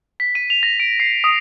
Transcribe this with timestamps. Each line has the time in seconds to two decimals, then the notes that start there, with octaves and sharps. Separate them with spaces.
0.20 B6
0.35 D#7
0.50 F7
0.63 A#6
0.80 D7
1.00 C7
1.24 D#6